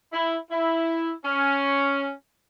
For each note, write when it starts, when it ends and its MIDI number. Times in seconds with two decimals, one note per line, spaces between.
0.13 0.36 64
0.50 1.11 64
1.24 2.11 61